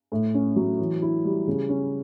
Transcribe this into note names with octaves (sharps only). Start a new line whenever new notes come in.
A2
C#4
F#3
E3
E4
G3
C#3
C#4